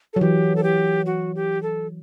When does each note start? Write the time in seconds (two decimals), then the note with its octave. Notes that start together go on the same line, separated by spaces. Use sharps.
0.13 A4
0.16 F#3
0.21 E3 G4
0.56 A4
0.63 G4
1.06 F#4
1.35 G4
1.63 A4